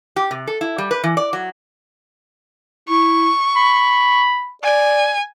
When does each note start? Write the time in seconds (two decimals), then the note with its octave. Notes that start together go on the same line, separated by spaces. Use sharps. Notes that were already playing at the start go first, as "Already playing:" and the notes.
0.16 G4
0.31 C3
0.47 A4
0.61 E4
0.78 G3
0.91 B4
1.04 E3
1.17 D5
1.33 F#3
2.89 E4 C#6
3.56 B5
4.63 D5 G#5